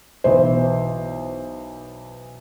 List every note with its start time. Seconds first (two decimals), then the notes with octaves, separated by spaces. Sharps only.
0.24 B1 E3 C5